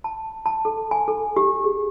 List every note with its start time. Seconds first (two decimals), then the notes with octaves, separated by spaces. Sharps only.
0.04 A5
0.46 A5
0.65 A4
0.91 G#5
1.08 A4
1.37 G4
1.64 G#4